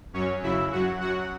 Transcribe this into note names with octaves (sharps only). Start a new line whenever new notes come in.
F#2 F#3 C#4 C#5
F#2 C#3 F#3 E4 E5
F#2 F#3 F#4 F#5
F#2 F#3 F#4 F#5